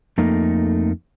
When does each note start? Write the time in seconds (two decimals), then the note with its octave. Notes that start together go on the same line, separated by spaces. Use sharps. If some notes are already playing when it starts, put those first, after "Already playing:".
0.18 F2 A3 A#3 D#4